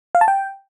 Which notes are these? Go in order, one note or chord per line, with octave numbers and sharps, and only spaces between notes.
F5
A5
G5